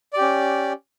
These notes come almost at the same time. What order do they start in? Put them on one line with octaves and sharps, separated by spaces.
D5 G4 C#4